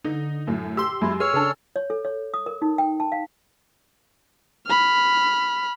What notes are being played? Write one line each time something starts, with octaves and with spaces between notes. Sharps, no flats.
D3 D#4
F#2 A2
G4 C6 E6
F#2 G#3 E4
G#4 C#5 G#5 E6 F6
C#3 D4 G#4 A4
C#5
A4
C#5
D#6
A#4
D#4
G5
A5
F5
B5 F6